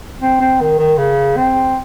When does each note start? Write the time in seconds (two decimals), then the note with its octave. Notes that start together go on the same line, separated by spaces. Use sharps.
0.21 C4
0.40 C4
0.60 D#3
0.78 D#3
0.98 C#3
1.37 C4